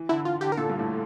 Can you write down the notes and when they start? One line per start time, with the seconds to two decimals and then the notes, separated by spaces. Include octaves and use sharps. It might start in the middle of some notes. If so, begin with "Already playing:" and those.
Already playing: E3
0.09 D3 E4
0.25 E3 F4
0.41 D3 G4
0.52 A#4
0.57 A#2 A4
0.70 G2
0.79 A2